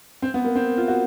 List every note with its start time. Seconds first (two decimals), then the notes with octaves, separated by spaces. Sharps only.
0.22 C4
0.34 B3
0.45 A#3
0.56 C4
0.78 F4
0.88 F#4